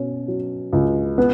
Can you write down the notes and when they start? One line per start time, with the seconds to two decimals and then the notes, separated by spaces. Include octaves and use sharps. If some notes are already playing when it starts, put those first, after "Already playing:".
Already playing: B2 C#4
0.28 F#3
0.73 C#2
1.18 B3